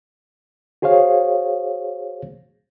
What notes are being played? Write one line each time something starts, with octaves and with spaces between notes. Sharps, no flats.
F#4 G#4 C5 C#5 F5